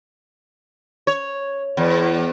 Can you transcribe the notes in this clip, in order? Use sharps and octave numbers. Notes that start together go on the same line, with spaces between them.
C#5
E2